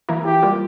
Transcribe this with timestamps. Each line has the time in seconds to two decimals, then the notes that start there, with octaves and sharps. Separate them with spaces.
0.09 E3 A#3 E4 A#4
0.25 E3 G4
0.42 G3 A#3 F4